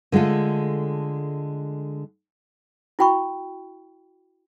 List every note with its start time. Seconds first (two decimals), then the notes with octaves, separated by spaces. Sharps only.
0.12 D3 G#3 A3 F4 A4
2.99 E4 F#4 G5 B5 C#6